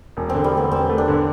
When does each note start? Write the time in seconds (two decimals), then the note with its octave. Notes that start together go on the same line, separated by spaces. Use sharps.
0.17 E1
0.30 D3 C4
0.44 G3
0.52 A3 B3
0.71 E1 C4
0.89 A3
0.98 D4
1.08 D3